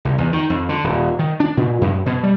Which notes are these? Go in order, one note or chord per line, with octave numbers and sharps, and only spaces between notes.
C2
E2
D#3
F2
D3
D#1
D#3
D4
A#2
F#2
B2
G3